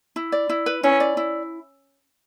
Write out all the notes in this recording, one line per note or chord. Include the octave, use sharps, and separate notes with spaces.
E4
D5
E4
B4
C#4 E4
D5
E4